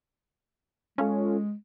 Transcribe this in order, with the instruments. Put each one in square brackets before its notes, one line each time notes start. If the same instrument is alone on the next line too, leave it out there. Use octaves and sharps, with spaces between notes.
[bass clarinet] G#3 [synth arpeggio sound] C#4 F4 A4